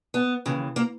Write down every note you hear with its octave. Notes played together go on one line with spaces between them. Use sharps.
B3
D#2 C#3 E3
A#3